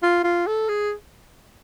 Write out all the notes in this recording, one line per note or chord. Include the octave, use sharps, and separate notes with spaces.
F4
F4
A4
G#4